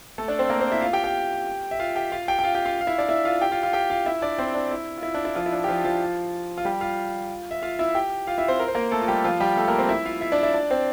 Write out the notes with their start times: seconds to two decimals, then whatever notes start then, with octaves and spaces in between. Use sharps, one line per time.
0.18 A3 A4
0.28 D4 D5
0.39 C4 C5
0.50 A#3 A#4
0.60 C4 C5
0.72 E4 E5
0.82 F4 F5
0.93 G4 G5
1.04 G4 G5
1.71 E5
1.80 F4 F5
1.96 G4 G5
2.12 F4 F5
2.28 G4 G5
2.39 G5
2.44 F4 F5
2.55 G4 G5
2.65 F4 F5
2.81 F5
2.87 E4 E5
2.98 D4 D5
3.09 E4 E5
3.25 F4 F5
3.41 G4 G5
3.52 F4 F5
3.63 F4 F5
3.73 G4 G5
3.90 F4 F5
4.06 E4 E5
4.22 D4 D5
4.39 C4 C5
4.55 D4
4.71 E4
4.98 F4
5.03 E4
5.14 D4
5.25 E4
5.35 F3 F4
5.46 E4
5.52 D4
5.64 G4
5.68 F3 F4
5.85 F3 F4
6.58 F4
6.65 G3 G4
6.81 F4 F5
7.51 E5
7.62 F4 F5
7.79 E4 E5
7.95 G4 G5
8.27 F4 F5
8.38 E4 E5
8.48 C4 C5
8.60 A#4
8.68 C5
8.75 A#3 A#4
8.92 A3 A4
9.01 F4
9.08 G3 G4
9.24 F3 F4
9.40 G3 G4
9.57 A3 A4
9.68 A#3 A#4
9.78 C4 C5
9.89 E4 E5
10.05 F4 F5
10.21 E4 E5
10.32 D4 D5
10.43 E4 E5
10.54 D4 D5
10.70 C4 C5